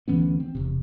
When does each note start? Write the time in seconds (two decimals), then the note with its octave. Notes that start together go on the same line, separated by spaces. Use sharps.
0.08 D2 E3 B3 C#4
0.40 C4
0.55 E1 C3